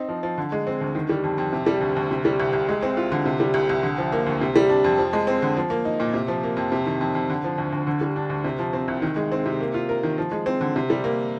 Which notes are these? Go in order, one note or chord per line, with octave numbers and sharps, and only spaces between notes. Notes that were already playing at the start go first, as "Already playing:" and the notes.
Already playing: C4 D#4
F3
F3
D3
G#3
C4
D2
D#3
G3
F2
F2
C3
G3
D2
D2
C3
G3
C2
C2
G#3
C4
F4
D3
C3
G3
C2
C2
D3
F3
A#3
D2
C3
G3
D4
F2
F3
G#3
C4
D3
F3
A#3
D#4
A#2
C3
F3
A#3
F2
C3
D#3
F2
F2
D3
F3
D2
D2
D3
G3
D4
D2
C3
F3
C4
C2
D#3
G#3
C4
C3
A#3
F4
A#4
D#3
F3
G#3
C4
D3
C3
G3
A#3